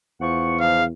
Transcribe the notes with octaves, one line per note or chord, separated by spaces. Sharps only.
E2 F3 F#5 C#6
G#2 C#3 F3 F5